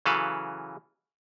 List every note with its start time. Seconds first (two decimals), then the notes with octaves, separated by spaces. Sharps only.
0.06 C#3 E3 F#3 A4 B4 F5